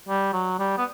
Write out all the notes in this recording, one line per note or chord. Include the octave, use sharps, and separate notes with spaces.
G3
F#3
G3
B3